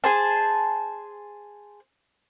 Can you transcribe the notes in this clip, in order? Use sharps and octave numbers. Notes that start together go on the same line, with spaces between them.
G#4 C5 A5